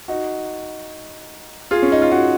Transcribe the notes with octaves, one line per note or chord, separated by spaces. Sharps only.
D#4 F#4
F4 G#4
C#4
D#4
F4
D#4 F#4